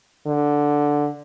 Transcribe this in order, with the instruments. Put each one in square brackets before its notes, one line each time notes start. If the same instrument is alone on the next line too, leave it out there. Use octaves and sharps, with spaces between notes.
[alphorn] D3